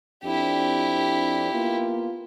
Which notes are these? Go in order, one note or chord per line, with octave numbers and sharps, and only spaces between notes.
F2 C4 D4 E4 G4
A#3 B3 F4